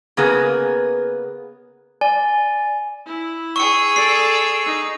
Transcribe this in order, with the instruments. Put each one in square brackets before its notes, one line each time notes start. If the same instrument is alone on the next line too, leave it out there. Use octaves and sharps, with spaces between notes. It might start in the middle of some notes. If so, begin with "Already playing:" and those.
[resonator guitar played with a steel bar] C#3 A#3 B3 G#4
[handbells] D5 [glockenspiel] G#5
[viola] E4
[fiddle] G#4 E6 [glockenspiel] C#6 C#7
[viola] A4 D5 [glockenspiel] C7
[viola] D#4